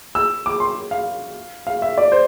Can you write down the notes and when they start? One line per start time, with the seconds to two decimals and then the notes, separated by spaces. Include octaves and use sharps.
0.15 E6
0.46 D6
0.60 C6
0.91 F5
1.67 F5
1.82 E5
1.98 D5
2.12 C5